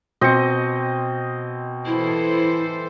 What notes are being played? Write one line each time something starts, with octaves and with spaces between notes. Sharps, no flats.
B2 C4 D#5 C#7
E3 E4 A4 C5